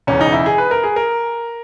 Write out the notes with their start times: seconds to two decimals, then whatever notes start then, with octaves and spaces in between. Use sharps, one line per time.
0.07 E1 E2 C#3 C#4
0.21 D#4
0.33 E4
0.46 G#4
0.58 B4
0.71 A#4
0.83 G#4
0.96 A#4